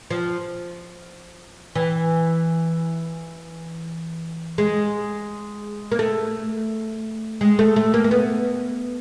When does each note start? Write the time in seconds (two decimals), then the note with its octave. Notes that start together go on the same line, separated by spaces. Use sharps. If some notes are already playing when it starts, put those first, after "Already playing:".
0.11 F3
1.75 E3
4.58 G#3
5.92 A#3
5.99 A3
7.41 G#3
7.59 A3
7.76 A3
7.94 A#3
8.04 A#3
8.11 B3